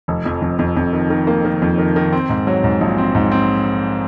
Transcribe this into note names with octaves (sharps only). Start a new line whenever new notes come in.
F1
F2
F2
F2
F2
D#3
D#3
A#3
D#3
F2
D#3
D#3
C4
G#2
F#3
G#2
A#1
C4
G#2
C4